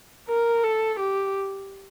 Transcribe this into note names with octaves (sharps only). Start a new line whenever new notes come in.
A#4
A4
G4